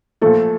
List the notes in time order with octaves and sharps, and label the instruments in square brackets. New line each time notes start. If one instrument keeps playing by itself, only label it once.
[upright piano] A#2 F3 A3 [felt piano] A4